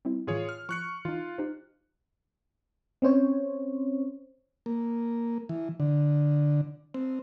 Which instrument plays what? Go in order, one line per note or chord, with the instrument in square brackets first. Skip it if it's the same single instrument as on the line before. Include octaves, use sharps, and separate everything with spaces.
[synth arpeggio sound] G3 C4 E4
[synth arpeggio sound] A2 E3 [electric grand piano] F4 G#4 C#5
[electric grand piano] F6
[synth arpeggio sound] F3 [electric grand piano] C#6 F#6 C#7
[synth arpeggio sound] E3 D#4 [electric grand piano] F4
[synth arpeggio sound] D#4 G4 C5
[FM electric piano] C4 C#4 C5 C#5
[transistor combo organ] A#3
E3
D3
C4